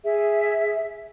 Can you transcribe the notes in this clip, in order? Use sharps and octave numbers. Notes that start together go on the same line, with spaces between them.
G#4 E5